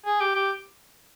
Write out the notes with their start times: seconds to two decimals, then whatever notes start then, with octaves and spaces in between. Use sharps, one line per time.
0.06 G#4
0.21 G4
0.35 G4